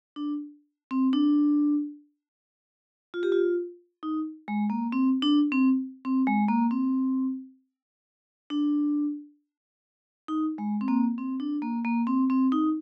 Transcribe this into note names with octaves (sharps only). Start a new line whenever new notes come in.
D4
C4
D4
F4
G4
F4
D#4
G#3
A#3
C4
D4
C4
C4
G#3
A#3
C4
D4
D#4
G#3
C4
A#3
C4
D4
A#3
A#3
C4
C4
D#4